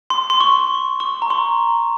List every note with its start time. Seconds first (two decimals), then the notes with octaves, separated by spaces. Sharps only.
0.10 C6
0.30 C6
0.40 C#6
1.00 C#6
1.22 A#5
1.30 C6